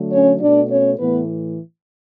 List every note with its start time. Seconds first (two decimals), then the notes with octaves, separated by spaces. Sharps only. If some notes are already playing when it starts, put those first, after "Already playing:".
Already playing: D3 F#3 A3
0.11 C#4 C#5
0.40 B2 A3 D4 D5
0.70 C#4 C#5
0.99 A2 E3 A3 B3 B4